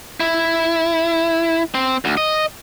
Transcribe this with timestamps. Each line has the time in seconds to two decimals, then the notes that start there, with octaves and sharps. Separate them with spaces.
0.20 E4
1.74 C4
2.05 D2
2.17 D#5